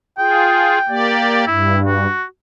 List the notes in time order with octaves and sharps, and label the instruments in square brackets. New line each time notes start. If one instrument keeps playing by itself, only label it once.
[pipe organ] F4 G#4 [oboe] G5
[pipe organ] A#3 G4 D5
[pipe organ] G2 [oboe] E4
[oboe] F#4